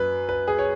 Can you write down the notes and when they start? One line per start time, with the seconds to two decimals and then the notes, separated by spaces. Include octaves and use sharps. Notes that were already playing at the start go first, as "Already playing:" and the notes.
Already playing: F#2 F#3 B4
0.29 B4
0.48 G#4
0.59 C#5